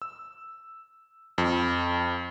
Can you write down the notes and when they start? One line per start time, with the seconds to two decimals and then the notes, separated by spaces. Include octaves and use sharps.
0.02 E6
1.38 F2